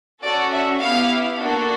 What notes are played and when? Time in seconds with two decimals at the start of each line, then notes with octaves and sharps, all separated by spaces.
0.22 C#4 F#4 A4 D5
0.52 E5
0.80 B3 E4 G4 F5
1.39 A#3 D4 F#4 A4